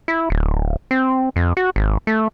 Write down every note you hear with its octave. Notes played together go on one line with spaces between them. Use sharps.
E4
D1
C4
F2
F#4
G#1
A3